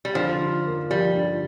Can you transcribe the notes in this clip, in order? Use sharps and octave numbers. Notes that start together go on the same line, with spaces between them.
G3
D3 F3
D#4
A#3
F3 G3
D3